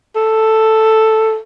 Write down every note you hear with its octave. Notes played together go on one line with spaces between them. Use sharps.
A4